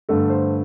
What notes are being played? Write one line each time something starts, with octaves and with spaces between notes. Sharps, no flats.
G2 D3 A3 A4
C5